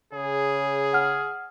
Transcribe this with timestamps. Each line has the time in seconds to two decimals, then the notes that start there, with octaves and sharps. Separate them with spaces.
0.13 C#3 G#4
0.93 F#5 F6